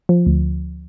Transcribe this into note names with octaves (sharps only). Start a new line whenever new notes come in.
F3
D2